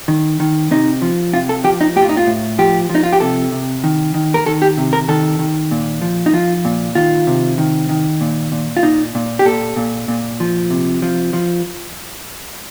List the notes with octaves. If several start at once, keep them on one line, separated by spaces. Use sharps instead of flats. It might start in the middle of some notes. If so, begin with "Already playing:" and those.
D#3
D#3
C3 D#4
F3
C3 F4
A4
F3 G4
D#4
A2 G4
F4
D#4
F4
A2
F3 G4
F3
D#4
F4
G4
C3 A4
C3
D#3
D#3
A#4
D#3 A4
G4
C3
A#4
D#3 A4
D#3
A#2
F3
D#4
F3 F4
A#2
D#3 F4
C3
D#3
D#3
A#2
A#2
F4
A#2 D#4
A#2
G4
A#2 A4
A#2
A#2
F3
C3
F3
F3